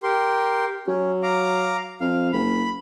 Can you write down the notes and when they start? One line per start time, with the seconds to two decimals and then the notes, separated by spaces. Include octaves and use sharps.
0.03 G4 A#4 C6
0.88 F#3 C#4
1.23 F5 A#5 D6
2.01 F2 F5
2.33 F#1 B5